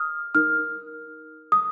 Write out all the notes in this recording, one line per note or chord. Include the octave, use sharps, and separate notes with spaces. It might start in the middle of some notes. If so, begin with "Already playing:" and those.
Already playing: D#6 F6
D#4 A#4 F6
D#6